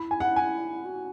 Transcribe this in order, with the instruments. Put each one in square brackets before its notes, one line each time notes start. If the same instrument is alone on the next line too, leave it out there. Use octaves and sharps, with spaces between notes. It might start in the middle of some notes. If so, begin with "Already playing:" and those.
Already playing: [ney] E4 [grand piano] B5
[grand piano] G#5
F#5
G#5
[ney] F#4